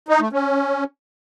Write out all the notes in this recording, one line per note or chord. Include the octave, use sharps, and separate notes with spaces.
D#4
A3
C#4